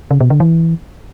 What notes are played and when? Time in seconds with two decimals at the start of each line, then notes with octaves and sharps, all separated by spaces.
0.11 C#3
0.20 B2
0.30 D3
0.40 E3